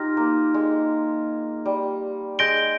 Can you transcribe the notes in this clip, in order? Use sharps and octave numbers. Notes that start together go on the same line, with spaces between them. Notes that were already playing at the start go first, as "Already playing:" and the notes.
Already playing: D#4 F4 G4 C6 F6 A#6
A#3
G#3
G3
G#3 G6 A#6 D7 G7